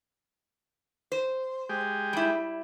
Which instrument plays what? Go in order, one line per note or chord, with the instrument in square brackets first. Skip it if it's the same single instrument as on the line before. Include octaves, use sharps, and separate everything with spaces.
[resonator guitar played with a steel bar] C5
[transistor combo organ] G#3 G4
[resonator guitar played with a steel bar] G3 E4